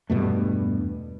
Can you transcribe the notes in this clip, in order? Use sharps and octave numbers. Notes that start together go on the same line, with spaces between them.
E2 G2 B2 A3